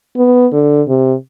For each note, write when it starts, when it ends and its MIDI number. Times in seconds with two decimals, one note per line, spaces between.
0.17 0.47 59
0.53 0.82 50
0.88 1.14 48